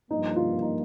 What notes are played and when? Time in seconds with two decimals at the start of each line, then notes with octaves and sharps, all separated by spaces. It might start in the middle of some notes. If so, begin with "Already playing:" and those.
0.11 G2 F3 A#3 D#4
0.36 F4
0.62 D#4